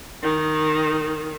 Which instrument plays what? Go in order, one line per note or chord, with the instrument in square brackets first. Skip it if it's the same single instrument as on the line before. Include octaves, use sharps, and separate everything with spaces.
[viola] D#3